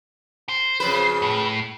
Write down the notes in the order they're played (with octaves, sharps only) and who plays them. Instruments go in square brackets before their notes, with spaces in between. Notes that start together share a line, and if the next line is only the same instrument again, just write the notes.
[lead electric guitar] C5
[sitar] F2 C#3 B4
[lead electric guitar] A2